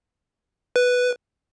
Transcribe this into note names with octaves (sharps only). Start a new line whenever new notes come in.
B4